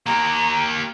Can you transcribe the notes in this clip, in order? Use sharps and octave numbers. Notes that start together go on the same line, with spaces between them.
A#3 G4 A#5